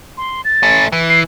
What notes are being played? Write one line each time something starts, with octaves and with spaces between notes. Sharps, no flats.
C6
A6
A3 C#4
E3
C7